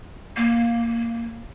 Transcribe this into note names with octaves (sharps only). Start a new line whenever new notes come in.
A#3